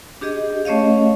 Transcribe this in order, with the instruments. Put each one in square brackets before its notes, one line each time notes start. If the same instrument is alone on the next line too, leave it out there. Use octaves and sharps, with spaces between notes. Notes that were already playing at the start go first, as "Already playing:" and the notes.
[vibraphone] D4 G4 G#4 D#5
A3 C#4 C#5 D#5 F5